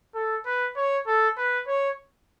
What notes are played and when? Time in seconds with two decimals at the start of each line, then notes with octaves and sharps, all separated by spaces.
0.15 A4
0.46 B4
0.76 C#5
1.07 A4
1.38 B4
1.68 C#5